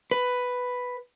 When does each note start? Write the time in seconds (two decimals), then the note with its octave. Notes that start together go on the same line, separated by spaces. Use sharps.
0.11 B4